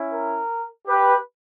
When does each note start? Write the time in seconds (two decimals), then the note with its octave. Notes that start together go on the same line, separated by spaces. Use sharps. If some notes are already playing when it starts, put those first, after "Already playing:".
Already playing: C#4 E4
0.12 A#4
0.88 G4 B4